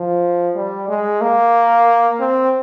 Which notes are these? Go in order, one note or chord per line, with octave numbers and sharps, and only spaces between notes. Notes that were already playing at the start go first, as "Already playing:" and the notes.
Already playing: F3
G3
G#3
A#3
C4